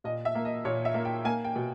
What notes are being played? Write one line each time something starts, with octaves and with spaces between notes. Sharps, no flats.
A#2 D#5
E5
A#3
D#5
A#2 C#5
E5
A#3
G5
A#3 G#5
G5
B2